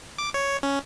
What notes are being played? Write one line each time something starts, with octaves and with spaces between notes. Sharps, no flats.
D6
C#5
C#4